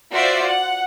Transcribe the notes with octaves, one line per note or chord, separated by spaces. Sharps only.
F4 F#4 C5 D5 E5
F#5